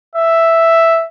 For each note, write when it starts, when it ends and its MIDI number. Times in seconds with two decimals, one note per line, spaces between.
0.16 1.05 76